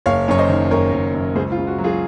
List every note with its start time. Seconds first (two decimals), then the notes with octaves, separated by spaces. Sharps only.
0.06 F#1 C#5 F5
0.28 F#2 C#5
0.38 C5 D#5
0.49 D#3
0.71 F#1 A#4 C#5
0.92 F#1
1.14 F#2
1.35 C#2 G#4 C5
1.52 F4
1.57 C#3
1.67 F#4
1.78 F#3
1.84 F4 G#4